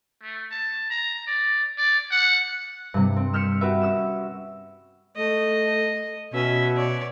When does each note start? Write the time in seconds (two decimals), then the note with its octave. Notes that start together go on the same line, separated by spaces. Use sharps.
0.23 A3
0.51 A5
0.90 A#5
1.27 D5
1.77 D5
2.11 F#5
2.94 G2 C3
3.16 C4
3.33 E6 F6 G6 B6 C#7 E7
3.61 F#4 G4 B4 E5
3.82 C#4 E6 E7
5.17 A3 D#5
6.33 B2 C#4 E5
6.77 C#5 D5